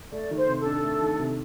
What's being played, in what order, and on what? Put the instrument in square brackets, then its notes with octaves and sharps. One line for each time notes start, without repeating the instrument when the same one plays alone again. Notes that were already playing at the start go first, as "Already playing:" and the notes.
[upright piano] A3 [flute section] D5
[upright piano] D#3
[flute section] C5
[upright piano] C3
[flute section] A4
[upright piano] D4
A3
D#3
C3